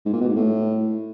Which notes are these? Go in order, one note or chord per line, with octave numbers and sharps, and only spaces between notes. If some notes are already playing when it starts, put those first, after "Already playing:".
G#2
A#2
B2
G#2
A2